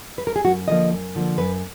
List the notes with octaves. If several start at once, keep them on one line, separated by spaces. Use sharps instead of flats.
B4
A#4
G#4
F#2 F#4
D3 F3 A#3 D#5
F#2
D3 F3 A#3
F#2 B4